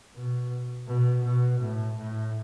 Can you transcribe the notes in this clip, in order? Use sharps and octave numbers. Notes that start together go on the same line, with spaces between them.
B2
B2
B2
A2
A2